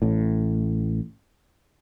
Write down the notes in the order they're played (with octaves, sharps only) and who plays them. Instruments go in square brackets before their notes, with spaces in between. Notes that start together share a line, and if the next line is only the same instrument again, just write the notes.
[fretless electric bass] A1 A2